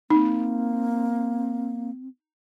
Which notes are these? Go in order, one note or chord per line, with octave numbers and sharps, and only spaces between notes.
A#3 C4 D#4